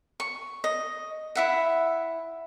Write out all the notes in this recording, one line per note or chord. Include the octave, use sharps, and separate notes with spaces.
C#6
D#5
E4 E5 F#5